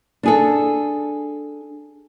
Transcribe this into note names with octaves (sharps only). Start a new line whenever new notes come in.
D4 G#4 A4